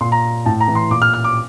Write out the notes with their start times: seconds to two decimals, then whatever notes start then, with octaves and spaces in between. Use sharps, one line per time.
0.01 A#2 C6
0.12 A#5
0.46 A2 A5
0.61 A#5
0.68 E3
0.75 C6
0.91 A#2 D6
1.02 F6
1.14 F6
1.24 D6